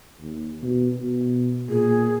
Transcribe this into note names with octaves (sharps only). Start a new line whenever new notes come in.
D#2
B2
B2
A#2 G#4